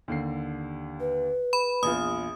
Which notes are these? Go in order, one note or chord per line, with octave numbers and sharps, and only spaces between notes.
D#2 D3 C7
B4
B5
A#1 E2 F4 D#6